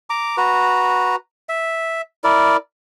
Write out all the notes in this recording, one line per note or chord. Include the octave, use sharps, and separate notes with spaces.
A#5 D6
F#4 B4 A#5
E5
E4 A#4 D5